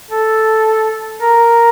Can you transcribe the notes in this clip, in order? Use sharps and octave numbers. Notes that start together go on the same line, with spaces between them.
A4
A#4